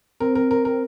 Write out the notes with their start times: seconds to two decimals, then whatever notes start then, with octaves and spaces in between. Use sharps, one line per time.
0.20 C4 A#4
0.35 A#4
0.51 A#4
0.65 A#4